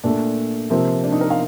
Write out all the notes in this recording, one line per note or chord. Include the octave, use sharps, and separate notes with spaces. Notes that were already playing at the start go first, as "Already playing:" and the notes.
A#2 A3 D4
C3 F3 A#3 C4
D4
D#4
A#4
F5